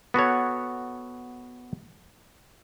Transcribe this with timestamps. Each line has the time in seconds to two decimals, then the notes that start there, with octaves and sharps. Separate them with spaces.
0.14 B3 F#4 A4 C#5